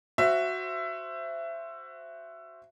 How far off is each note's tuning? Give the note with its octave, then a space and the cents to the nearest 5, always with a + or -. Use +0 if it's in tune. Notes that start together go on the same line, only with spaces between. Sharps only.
F#4 +0 C5 +0 E5 +20